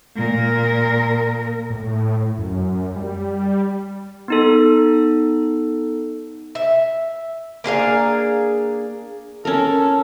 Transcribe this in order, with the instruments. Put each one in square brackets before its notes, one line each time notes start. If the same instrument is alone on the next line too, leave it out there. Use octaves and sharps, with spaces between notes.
[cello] A#2 A#4
[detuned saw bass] A2
F#2
G3
[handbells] B3 D#4 A4
[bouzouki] E5
A#3 D4 G#4 F5
[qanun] C#4 A#4 [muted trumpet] A4